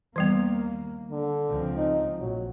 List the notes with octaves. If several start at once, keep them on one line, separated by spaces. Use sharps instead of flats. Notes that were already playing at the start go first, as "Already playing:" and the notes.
D#2 E3 G3 A#3 B3
D3
C#2 F3 C4
D#4
A#1 F#3